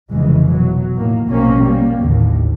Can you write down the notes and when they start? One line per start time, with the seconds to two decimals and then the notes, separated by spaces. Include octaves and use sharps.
0.12 F1 C#3 E3 G#3
0.50 B2 F#3
0.94 A2 D#3 A#3
1.27 A#1 B2 A#3 C4 C#4
1.61 G3 A#3
2.00 G#1 D#2 A2 D3